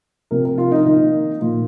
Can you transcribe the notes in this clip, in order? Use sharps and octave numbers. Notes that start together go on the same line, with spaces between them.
C3 F3 C4 A#4
A#4
F4
D#4
D#3 A#3 D#4
A#2 F3 A#3 F4